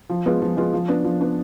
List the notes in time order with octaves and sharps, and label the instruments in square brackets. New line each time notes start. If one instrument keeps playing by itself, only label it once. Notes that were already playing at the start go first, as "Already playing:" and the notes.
[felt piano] F3
G#3 B3 F4
F3
G#3 B3 F4
F3
B3 D4
F3
B3 D4